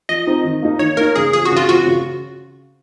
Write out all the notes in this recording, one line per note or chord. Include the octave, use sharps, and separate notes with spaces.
F3 D#5
C4 D#4
D#3
A#3 D#4
D#3 C#5
A#3 D#4 A#4
C#3 G#4
F3 C4 G#4
F#4
C#3
F4
F3 C4 F#4
C#3